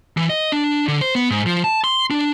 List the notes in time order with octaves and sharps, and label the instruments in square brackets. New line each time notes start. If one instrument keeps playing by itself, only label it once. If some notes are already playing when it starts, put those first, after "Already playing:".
[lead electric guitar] E3
D#5
D4
D3
C5
B3
G#2
F3
A5
C6
D4